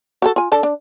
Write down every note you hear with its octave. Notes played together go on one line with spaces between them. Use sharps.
F#4 G4 A4
F4 G#5
D4 A4 A5
D4